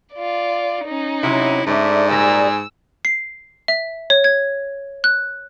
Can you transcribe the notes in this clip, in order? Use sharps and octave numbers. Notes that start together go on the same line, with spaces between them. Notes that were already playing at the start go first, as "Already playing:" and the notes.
F4 D5
C#4 D#4
C3 F#3 E4
G#2 A3 D4 E5
A#2 G3 G#4 A#5 E6
C7
E5
C#5
G#6
F#6